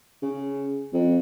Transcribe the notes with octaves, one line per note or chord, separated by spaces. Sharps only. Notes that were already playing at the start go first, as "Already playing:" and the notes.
C#3
F2